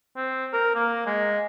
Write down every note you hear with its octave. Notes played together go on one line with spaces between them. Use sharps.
C4
A#4
A#3
G#3